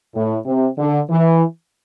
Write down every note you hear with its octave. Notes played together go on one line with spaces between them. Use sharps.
A2
C3
D3
E3